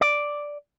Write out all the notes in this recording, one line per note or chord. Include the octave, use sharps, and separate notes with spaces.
D5